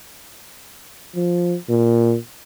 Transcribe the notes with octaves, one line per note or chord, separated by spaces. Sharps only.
F3
A#2